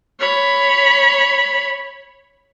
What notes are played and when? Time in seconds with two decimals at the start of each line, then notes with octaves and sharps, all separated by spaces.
0.20 C#5 B5